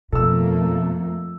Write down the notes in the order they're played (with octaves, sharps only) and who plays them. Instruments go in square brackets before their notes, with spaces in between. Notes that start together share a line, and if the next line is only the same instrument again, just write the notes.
[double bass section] F2 A3 A#3 [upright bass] B2 [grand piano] A4 E6